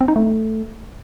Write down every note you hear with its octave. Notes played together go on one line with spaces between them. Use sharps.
C4
D#4
A3